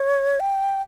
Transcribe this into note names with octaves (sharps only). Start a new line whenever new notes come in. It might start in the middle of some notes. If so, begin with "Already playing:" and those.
Already playing: C#5
G5